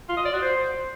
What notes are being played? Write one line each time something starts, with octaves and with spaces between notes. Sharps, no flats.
F4
D#5
D5
F#4
C5